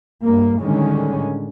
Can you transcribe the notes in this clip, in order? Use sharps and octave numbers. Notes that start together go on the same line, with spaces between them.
G2 A#3
A2 D3 D#3 G3 G#3 C#4